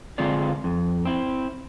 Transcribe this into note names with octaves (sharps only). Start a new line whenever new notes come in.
D3 G#3 C4 F4 G#4 D5
F2
C4 E4